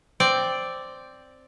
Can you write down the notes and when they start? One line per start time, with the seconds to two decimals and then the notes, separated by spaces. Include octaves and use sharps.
0.20 C4 D5